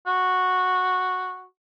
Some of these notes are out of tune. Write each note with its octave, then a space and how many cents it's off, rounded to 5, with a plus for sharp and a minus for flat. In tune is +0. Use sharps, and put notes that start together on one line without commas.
F#4 -5